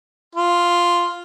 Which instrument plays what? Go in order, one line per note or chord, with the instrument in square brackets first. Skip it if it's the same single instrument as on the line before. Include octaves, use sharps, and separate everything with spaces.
[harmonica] F4